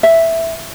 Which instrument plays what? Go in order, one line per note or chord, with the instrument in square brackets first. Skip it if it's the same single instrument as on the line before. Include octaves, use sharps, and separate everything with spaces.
[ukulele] E5